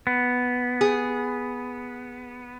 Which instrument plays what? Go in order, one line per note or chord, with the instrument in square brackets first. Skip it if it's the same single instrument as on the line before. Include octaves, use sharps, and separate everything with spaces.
[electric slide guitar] B3
[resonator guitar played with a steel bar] G#4